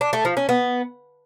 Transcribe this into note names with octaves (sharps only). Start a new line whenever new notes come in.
D4
A3
F3
C#4
B3